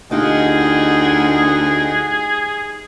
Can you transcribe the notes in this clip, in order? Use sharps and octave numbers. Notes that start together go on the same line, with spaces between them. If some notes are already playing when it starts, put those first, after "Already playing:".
D2 D#4 F4 G4 G#4 D#5 F#5 G5